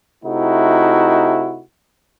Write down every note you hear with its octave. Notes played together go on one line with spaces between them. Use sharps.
C3 A3 D#4 E4 F#4